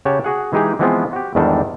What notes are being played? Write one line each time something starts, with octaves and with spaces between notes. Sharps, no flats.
C#3 G4 C#5 F#5 A5
F#4 G#4 F#5
E3 G#3 D#4 G4 G#4
E3 F3 G#3 B3 C4 F4
F#4 G4
E2 G#2 D#3 G3 D4 A4